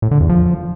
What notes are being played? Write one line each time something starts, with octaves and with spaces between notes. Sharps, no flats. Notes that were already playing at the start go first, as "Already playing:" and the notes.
A2
D3
E2
F3